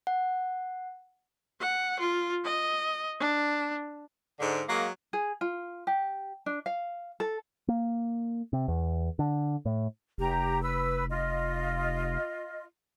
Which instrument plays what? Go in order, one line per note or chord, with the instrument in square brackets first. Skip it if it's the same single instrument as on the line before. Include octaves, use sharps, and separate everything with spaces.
[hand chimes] F#5
[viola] F#5
F4
D#5
D4
[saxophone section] G#2 D3
F#3 G#3 A#3
[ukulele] G#4
F4
G4
D4
F5
A4
[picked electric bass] A#3
C3
E2
D3
A2
[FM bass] F1 [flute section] G4 A#5
[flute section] B4 E6
F4 D#5